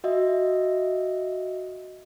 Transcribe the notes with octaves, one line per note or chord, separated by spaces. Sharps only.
F#4 D#5 E5